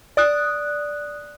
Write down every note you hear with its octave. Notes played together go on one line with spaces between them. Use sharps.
D5 D#6 F#6